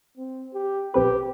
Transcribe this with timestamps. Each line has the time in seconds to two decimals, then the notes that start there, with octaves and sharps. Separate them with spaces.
0.18 C4
0.54 G4
0.94 B1 C4 G4 B4